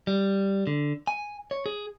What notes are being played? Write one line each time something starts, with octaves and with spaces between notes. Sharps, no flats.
G3
D3
G#5
C#5
G#4